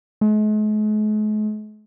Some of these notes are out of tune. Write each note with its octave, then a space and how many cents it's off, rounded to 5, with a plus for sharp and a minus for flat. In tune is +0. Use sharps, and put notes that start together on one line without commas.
G#3 +45